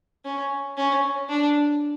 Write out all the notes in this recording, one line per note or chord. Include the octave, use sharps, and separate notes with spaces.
C#4
C#4
D4